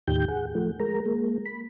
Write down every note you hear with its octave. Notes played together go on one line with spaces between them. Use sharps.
D#2 A2 D#3 G4 G6
G#4 F#5
F3 A3
G#3 A#4 A#5
G#3 A#3
B5